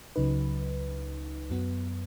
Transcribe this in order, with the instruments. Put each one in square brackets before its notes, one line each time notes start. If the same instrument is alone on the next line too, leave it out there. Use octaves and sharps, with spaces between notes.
[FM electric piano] C#2 C#3 F#3 D#4 B4
F#2 F#3 B3